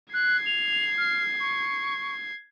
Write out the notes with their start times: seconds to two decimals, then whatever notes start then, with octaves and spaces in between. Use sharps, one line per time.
0.13 F#6 G#6 C7
0.46 F7
0.97 F6
1.39 C#6